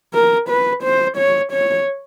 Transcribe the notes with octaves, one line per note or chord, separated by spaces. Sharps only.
A#4
B4
C5
C#5
C#5